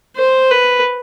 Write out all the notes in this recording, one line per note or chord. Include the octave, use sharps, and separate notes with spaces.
C5
B4